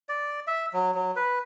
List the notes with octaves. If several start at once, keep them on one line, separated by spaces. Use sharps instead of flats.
D5
E5
F#3
F#3
B4